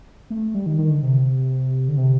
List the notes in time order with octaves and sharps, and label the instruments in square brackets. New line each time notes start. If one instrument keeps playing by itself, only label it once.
[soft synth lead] A3
G3
D#3
D#3
D3
C3
D3
C3